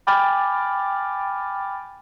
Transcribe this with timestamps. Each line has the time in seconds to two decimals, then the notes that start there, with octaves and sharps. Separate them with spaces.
0.07 G5 G#5 B5 D6 F6 A6